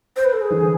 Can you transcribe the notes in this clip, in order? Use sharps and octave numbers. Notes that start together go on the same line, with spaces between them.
C5
B4
A4
G#4
D3 E3